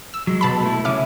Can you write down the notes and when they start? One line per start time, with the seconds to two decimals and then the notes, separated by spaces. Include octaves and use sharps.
0.14 E6
0.27 F#3 G#3
0.41 B2 A5 B5
0.63 A3 E4
0.85 C#3 C#4 E5 D6 F6